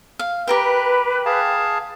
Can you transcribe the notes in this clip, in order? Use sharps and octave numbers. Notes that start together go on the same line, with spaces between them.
F5
G4 A#4 B4 G5
G#4 F5 A5